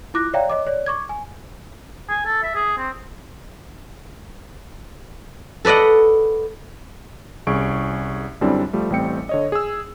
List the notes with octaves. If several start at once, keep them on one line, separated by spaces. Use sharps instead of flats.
E4 F4 D6 F#6 A#6
C#5 D5 E5 F5 G5 A#5
C#5 D#5 D6
C#5 D5
C#6 D6 G#6
G#5
G#5
A4
E5
G#4
C4
A4 B4 D5 D#5 F#5
C2 C#4 G#4 C#6 D7
F#2 D3 G3 C4 D4 E4
F3 G3 A3
A1 G3 A3 C4 G5 C#7
D3 C#5 D#5
G#4 E6